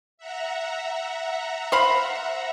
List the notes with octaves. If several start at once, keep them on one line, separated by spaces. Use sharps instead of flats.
E5 F#5 A#5
C5 F5 B5